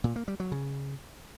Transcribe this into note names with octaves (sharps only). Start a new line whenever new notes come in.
A#2
A#3
G3
F#3
C#3